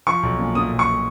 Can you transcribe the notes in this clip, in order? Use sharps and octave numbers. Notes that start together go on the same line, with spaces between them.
F3 C#6
B1
A#2
A#2 D#6
B1
C#6